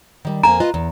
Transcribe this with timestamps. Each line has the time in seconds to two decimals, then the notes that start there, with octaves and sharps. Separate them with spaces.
0.25 D#3 G3
0.43 F2 A#3 G#5 A#5
0.60 F4 B4 D#5
0.74 E2